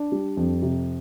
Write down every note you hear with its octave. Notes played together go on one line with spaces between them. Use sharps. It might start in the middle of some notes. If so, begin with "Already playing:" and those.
Already playing: D4
G3
F2
C3